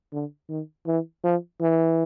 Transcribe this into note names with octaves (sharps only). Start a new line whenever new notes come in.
D3
D#3
E3
F3
E3